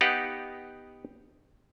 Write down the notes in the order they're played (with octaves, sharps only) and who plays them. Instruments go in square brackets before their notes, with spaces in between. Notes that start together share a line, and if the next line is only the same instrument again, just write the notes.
[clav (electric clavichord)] B3 D#4 G4 D#5 F5 F#5